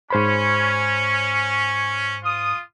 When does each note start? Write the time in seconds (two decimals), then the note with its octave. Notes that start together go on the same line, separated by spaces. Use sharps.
0.10 G#2 C#4 C5 B5
2.22 F4 D#6